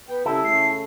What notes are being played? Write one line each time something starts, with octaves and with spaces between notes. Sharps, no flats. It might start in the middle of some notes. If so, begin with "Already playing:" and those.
B3 G5
C#3 G3 E4 A4
C#3 A3 C7